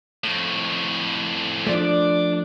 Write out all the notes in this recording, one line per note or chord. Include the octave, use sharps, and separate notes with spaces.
F2 A2
F3 A3 D4 D5